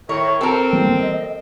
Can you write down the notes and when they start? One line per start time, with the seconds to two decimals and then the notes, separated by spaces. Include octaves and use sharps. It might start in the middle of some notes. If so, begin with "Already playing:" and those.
0.09 A2 D#3 A#4 C#5
0.41 C4 A4 A#4
0.73 E3 G3 A#3
0.97 D#5